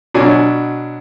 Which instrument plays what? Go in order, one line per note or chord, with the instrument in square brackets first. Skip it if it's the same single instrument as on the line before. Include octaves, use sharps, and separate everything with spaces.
[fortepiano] B2 F#3 D4 G#5